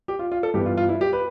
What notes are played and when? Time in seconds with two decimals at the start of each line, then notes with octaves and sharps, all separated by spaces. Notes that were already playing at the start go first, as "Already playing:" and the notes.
0.08 G4
0.19 F4
0.32 F4
0.43 A4
0.54 G2 E3 B3 G4
0.66 F4
0.77 F4
0.89 E4
1.01 G4
1.13 B4